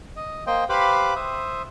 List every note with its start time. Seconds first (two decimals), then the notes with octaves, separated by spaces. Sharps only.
0.16 D#5
0.47 A#3 C5 D#5 G5
0.69 G4 B4 C5 F5 B5 D6
1.16 C5 E5 D#6